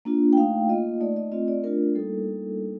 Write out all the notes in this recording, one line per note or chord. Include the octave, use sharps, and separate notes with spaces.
A#3 D4 F4
G5
A3 D#4 F5
A#3 F4 D#5
A3 D#4 D5
D#5
A3 C4 F4 D#5
D5
A3 D4 F4 A#4
G3 A#3 D#4 A4